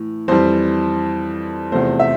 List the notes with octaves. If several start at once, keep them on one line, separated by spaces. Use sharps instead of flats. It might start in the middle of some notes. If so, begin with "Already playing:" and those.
Already playing: A2 E3
F2 E3 G3 C5
E2 C3 F3 A3 C5
E5